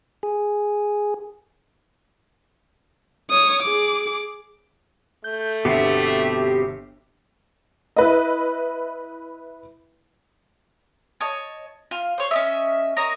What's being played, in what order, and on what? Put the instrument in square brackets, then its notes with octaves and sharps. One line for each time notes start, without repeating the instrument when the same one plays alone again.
[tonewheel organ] G#4
[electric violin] C#5 D#6
G#4 D6
[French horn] A3 [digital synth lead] G6
[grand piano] G1 E5 [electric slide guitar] B2 B3 C4 [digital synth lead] G4
[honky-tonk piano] E4 B4 D#5
[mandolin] C#5 D#5 A5
F4 F5
C5 C#5
C#4 D#5 E5
A#4 C#5 D#5 A#5